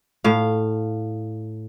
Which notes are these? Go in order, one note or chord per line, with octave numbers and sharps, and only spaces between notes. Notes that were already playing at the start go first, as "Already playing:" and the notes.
A2 F5